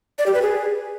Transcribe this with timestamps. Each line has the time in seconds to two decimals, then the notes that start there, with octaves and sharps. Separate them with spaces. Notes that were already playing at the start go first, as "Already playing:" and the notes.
0.19 D5
0.26 G4
0.34 B4
0.42 G#4